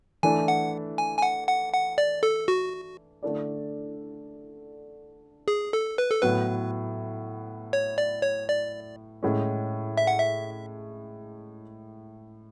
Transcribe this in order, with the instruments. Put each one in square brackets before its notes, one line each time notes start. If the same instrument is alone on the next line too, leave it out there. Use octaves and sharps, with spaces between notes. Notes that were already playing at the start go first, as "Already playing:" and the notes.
[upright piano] E3 A3 D4 [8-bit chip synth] G#5
[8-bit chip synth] F#5
G#5
G#5
F#5
F#5
F#5
D5
A4
F#4
[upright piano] D3 A3 D4 A4 D5
[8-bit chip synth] G#4
A4
B4
A4
[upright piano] A2 F#3 B3 [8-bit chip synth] B4
[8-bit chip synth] C#5
D5
C#5
D5
[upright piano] A2 G#3 C#4
[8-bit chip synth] E5
F#5
E5